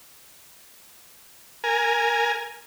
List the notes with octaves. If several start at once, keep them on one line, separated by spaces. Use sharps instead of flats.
A#4 G#5